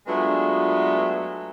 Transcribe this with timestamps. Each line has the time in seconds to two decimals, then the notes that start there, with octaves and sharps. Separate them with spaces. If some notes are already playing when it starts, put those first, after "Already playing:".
0.07 F#3 G#3 A3 B3 D4 F4